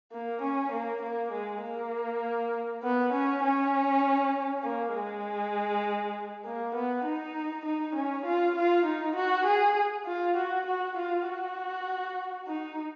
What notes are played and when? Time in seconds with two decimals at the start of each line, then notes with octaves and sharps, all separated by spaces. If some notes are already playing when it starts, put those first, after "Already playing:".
0.12 A#3
0.42 C#4
0.72 A#3
1.02 A#3
1.32 G#3
1.63 A#3
2.83 B3
3.13 C#4
3.43 C#4
4.63 A#3
4.94 G#3
6.45 A#3
6.75 B3
7.05 D#4
7.65 D#4
7.95 C#4
8.26 F4
8.56 F4
8.85 D#4
9.15 F#4
9.45 G#4
10.06 F4
10.37 F#4
10.66 F#4
10.96 F4
11.26 F#4
12.47 D#4